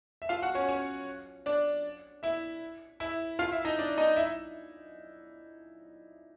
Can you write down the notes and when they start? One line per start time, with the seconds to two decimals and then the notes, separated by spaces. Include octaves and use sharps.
0.22 E5
0.29 F4 F5
0.42 F#4 F#5
0.55 C#4 C#5
0.69 C#4 C#5
1.46 D4 D5
2.23 E4 E5
3.00 E4 E5
3.39 F4 F5
3.52 E4 E5
3.65 D#4 D#5
3.79 D4 D5
3.97 D#4 D#5
4.16 E4 E5